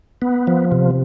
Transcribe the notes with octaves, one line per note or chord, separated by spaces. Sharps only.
B3
F3
C3